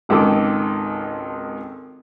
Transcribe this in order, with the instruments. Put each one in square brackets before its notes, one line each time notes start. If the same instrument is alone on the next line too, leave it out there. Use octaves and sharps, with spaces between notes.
[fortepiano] G#1 C#2 D#3 A4 D6 D#6